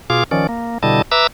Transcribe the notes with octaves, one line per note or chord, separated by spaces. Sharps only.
B2 F4 G#4 F5 D6
D#3 F3 C#4 D5
A#3
B2 D3 G3 E4 D#5 A5
B4 E5 A#5 D6 E6